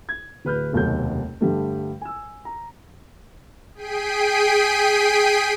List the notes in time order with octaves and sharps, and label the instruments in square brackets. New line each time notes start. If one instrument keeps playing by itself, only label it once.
[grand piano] G#6
D1 B4 F6 G6
F1 D#2 B2 F#3 A4 G6
G2 D3 G3 A3
G#5 E6
A#5
[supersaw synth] G#4 G5 B6 C7 D7 D#7